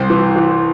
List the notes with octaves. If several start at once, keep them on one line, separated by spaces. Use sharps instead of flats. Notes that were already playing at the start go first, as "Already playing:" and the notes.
Already playing: C2 C5
E3
E3